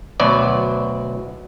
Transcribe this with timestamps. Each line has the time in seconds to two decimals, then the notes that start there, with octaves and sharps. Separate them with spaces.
0.20 D2 B2 F#3 D5